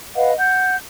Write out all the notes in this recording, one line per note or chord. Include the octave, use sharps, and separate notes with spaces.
B4 D#5 F5 F#5
F#5 G6